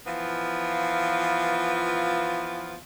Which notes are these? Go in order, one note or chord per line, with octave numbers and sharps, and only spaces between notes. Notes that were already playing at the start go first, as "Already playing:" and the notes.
E3 F3 B3 F4